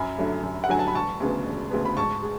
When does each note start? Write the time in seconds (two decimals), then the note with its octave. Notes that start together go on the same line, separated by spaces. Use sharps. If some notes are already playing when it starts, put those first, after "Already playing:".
Already playing: F#2 G#5 B5
0.19 D3 F#3 A3
0.43 F#2
0.64 F#5
0.69 D3 F#3 A3 G#5
0.79 A5
0.88 B5
0.95 E1 A5 C#6
1.20 D2 C#3 G#3 B3
1.47 E1
1.71 D2 C#3 G#3 B3
1.85 B5
1.97 G#2 A5 C#6
2.22 G#3